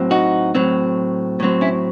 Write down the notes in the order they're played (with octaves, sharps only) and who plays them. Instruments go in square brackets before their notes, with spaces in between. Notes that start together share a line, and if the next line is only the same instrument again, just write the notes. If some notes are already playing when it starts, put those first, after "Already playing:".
Already playing: [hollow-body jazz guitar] A2 F#3 C4
D#4 F#4
A2 F#3 C4
A2 F#3 C4
C#4 E4